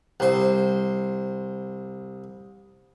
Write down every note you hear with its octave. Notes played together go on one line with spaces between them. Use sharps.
C2 C5